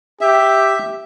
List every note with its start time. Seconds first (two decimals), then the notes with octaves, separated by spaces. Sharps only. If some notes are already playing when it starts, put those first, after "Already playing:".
0.21 G4 E5